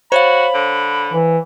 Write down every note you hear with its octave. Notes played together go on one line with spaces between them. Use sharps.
F#4 C5 C#5 F5 B5
D3
E3